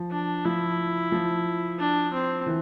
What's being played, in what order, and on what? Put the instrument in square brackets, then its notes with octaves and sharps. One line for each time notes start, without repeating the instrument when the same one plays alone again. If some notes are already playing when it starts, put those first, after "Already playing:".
Already playing: [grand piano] F3
[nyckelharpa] D4
[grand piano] F3 [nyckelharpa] E4
[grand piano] F3
[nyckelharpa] D4
C4
[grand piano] E3